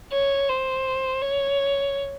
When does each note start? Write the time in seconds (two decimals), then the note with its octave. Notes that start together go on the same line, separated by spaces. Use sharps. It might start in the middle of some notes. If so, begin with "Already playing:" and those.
0.12 C#5
0.49 C5
1.22 C#5